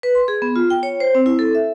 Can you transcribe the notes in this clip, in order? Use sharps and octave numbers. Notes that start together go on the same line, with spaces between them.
B4
C6
G#4
B3
F4
G5
C#5
C5
C4
E4
A4
E5